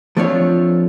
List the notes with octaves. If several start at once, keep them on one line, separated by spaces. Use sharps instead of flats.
F3 A3 C4 D4 F4 C#5